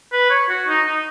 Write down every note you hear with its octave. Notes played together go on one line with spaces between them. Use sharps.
B4
C#5
F#4
D#4
D#4